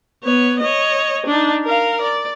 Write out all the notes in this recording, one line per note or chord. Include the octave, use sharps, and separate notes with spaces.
B3 C#5
C#5 D#5
D4 D#4
A#4 F5
D5